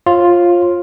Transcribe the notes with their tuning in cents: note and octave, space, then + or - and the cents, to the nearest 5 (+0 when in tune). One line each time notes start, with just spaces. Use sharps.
F4 +0 C#5 -45